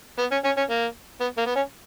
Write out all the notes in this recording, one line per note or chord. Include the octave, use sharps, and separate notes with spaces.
B3
C#4
C#4
C#4
A#3
B3
A#3
B3
C#4